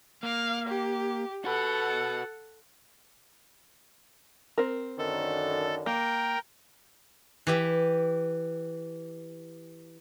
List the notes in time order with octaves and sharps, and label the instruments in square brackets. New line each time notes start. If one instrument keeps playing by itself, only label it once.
[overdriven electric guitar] A#3 [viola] F5
[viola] G4
[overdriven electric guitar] F#4 B4 [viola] A4 F#5
[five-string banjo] C4 A#4
[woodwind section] F#2 D3 D#3 [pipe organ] A4
[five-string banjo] A#3 [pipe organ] A#4 G5
[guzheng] E3 G4 E5